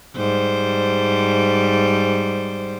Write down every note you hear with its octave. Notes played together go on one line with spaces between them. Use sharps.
G#2 G3 C5